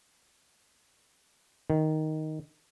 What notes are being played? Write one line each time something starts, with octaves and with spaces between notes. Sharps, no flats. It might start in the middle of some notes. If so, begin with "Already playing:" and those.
D#3